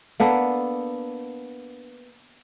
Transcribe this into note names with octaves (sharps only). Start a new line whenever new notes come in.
A#3 B3 D4 A4